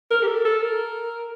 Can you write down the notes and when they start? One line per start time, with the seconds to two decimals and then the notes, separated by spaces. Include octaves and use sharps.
0.11 A#4
0.23 G4
0.27 A4
0.45 A4
0.62 A#4